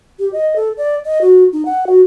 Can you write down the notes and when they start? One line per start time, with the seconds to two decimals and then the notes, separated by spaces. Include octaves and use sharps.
0.19 G4
0.33 D#5
0.56 A4
0.78 D5
1.05 D#5
1.21 F#4
1.53 D#4
1.65 F#5
1.87 F#4